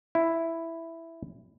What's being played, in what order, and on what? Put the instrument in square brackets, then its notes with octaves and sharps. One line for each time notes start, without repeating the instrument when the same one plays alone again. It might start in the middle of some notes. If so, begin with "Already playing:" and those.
[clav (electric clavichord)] E4